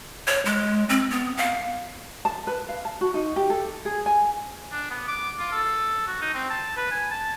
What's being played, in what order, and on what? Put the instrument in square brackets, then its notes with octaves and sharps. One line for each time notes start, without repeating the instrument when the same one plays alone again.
[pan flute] C#5
G#3
C4
B3
F5
[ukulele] A5
B4
F5
A5
F#4
D#4
G4
A4
G#4
G#5
[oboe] D4
B3
D6
F4
A4
F#4
D#4
C4
A5
B4
G#5
A5